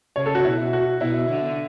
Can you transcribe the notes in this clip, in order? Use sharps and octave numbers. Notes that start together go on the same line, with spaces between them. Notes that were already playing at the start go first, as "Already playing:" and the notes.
C#3 C#5
A4
F#4
B2 E4
F#4
B2 E4
D3